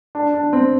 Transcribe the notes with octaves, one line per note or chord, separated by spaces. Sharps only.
D4
D4
C4